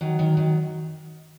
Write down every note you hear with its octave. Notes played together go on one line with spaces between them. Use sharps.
D#3 F#3
D#3 F#3
D#3 F#3